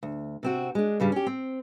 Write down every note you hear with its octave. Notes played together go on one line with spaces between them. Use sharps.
D2
C3 C4 F#4
G#3 D4
G2 C#3 G3
C#4 G4
C4